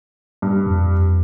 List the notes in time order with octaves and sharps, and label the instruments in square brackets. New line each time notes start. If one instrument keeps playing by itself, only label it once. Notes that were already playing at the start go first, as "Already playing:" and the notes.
[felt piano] G2
[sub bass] F2